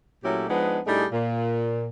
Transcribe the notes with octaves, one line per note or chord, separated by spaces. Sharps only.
A#2 F#3 A3 C#4 E4 G4
F3 G#3 B3 D4 D#4 B4
A2 G3 A3 D4 D#4 G#4
A#2